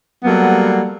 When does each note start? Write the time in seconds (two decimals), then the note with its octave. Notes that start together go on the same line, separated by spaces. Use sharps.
0.24 F#3 G3 A#3 B3 A4